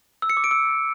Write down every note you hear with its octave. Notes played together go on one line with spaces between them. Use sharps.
E6
C#7
D6
D7
E6